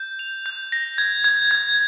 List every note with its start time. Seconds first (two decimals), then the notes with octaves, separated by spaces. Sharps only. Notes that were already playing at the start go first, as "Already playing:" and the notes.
Already playing: G6
0.19 F7
0.46 G6
0.72 A#6
0.98 G#6
1.24 G#6
1.51 G#6